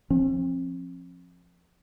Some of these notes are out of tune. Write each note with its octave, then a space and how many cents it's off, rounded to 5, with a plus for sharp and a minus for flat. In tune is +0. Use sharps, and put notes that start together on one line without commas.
F3 +0 C4 +40